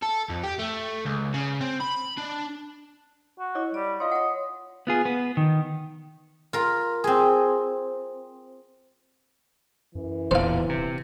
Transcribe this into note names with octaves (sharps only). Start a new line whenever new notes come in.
A4
F2
G4
A3
C#2
C#3
C4
B5
D4
F#4
E4 C#5 D#5 D6
G3 D5
F4 C#5 D#5 F5 C6
F4 C#5 F#5 D#6
B3 F4 G#4
B3
D#3
F4 A#4
C4 G#4
F#2 E3
D1 E2 A#2 D3 C5 F5
C3